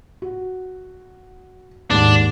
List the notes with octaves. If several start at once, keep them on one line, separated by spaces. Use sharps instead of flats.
F#4
D#2 G#2 D4